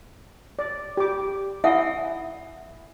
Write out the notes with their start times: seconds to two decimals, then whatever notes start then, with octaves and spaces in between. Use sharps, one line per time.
0.59 D5
0.97 G4 D6
1.64 E4 D#5 E5 F#5 G#5